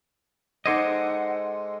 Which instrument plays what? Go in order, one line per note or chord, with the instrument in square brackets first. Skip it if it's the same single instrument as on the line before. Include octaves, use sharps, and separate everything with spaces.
[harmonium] G#3 [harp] D#4 D6 G#6 [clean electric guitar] A4 C5 D#5 [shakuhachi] F#5